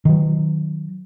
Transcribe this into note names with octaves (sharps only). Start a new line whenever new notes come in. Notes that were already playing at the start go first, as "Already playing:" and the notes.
D#3 F#3